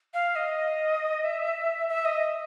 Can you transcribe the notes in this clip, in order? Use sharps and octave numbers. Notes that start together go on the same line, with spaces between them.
F5
D#5
E5
E5
D#5